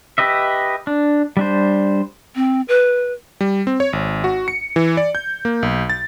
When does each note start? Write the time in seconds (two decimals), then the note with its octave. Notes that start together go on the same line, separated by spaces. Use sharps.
0.18 G4 B4 D#5 E5
0.87 D4
1.37 G3 D4 C5
2.35 C4
2.68 B4
3.41 G3
3.67 C4
3.80 C#5
3.93 G#1
4.24 F#4
4.48 C#7
4.76 E3
4.97 D5
5.15 G6
5.45 A#3
5.63 B1
5.90 A6